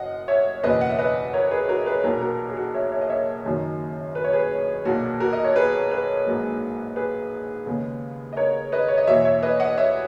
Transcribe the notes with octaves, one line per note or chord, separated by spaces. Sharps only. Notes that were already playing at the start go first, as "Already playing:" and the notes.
Already playing: F#1 F#2 D#5 F#5
C#5 E5
F#1 E2 B2 B4 D#5
F#5
E5
B4 D#5
A#4 C#5
G#4 B4
F#4 A#4
G#4 B4
B1 A#2 A#3 F#4 A#4
F#4 A#4
G#4
F#4
C#5 E5
C#5 E5
D#5
C#5 E5
F#1 F#2 D#3 F#3
B4
C#5
G#4 B4
B1 A#2 A#3 F#4
F#4 A#4
D#5
C#5
G#4 B4
G#4 B4
A#1 G#2 F#3 A#3
G#4 B4
D#2 C#3 G#3 B3
D#5
A#4 C#5
B4 D#5
C#5
D#5
E2 B2 A#3 C#5 E5
C#5 E5
B4 D#5
D#5 F#5
C#5 E5